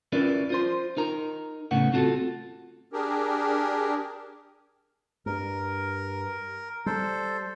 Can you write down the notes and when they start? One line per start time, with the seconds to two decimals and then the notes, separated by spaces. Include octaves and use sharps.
0.12 C#4 E4 F4 A#4 B4 D5
0.50 F4 C5 C6
0.97 D#4 A#4 A#5
1.71 A2 C#3 B3 C#4 F#5
1.93 C4 F4 F#4 A4
2.93 D4 G4 G#4 A#4
5.26 G2 A#4
6.86 G3 A4 C5